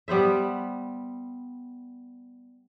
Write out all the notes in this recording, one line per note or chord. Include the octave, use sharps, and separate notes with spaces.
G3 B3 C5 E5